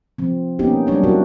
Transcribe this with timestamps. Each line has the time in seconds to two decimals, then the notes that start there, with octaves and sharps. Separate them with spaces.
0.18 F3 C4
0.59 A#3 B3 C#4 D#4 G4
0.87 F#3 G3 D4 C#5
1.03 E4 F#4 A#4